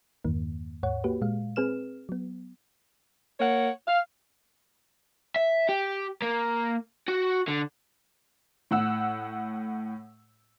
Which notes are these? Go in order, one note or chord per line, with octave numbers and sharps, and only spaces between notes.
E2 G2 D#3 A#3
D#2 G#2 C#5 F#5
A#3 F#4 G4 B4
A#2 G#3 F5
C4 G#4 B4 F6 E7
F#3 B3
A#3 C#5 F#5
F5
E5
G4
A#3
F#4
D3
A2 F#5 E6